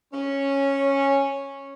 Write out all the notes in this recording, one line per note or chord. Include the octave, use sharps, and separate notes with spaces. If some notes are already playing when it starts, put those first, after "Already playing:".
C#4